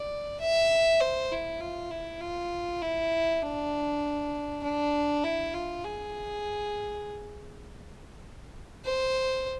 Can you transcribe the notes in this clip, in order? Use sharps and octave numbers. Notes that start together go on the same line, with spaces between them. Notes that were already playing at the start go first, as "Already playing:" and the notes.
Already playing: D5
E5
C5
E4
F4
E4
F4
E4
D4
D4
E4
F4
G#4
C5